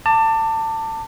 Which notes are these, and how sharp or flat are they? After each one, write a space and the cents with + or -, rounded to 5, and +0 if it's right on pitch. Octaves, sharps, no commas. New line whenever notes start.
A5 +25 D6 +10